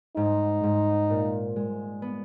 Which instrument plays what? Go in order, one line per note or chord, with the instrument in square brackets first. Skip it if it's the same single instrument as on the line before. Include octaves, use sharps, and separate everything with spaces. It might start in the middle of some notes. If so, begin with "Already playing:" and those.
[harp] G#2 [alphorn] D#4
[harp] G#2
A#2
G#3
B3